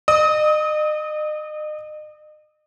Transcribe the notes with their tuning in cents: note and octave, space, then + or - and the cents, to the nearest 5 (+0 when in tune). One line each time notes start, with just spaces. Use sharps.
D#5 -40 D#6 +35